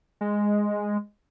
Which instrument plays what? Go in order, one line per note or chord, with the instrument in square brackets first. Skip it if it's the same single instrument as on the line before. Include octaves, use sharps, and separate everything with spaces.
[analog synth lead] G#3